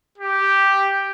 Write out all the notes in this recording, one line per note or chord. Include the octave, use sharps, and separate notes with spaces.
G4